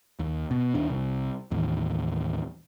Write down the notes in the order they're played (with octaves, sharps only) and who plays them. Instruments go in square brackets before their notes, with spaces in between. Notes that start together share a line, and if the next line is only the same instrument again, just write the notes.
[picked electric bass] D#2
B2
D#1 D#2 D#3 D4
C2
A1 D#2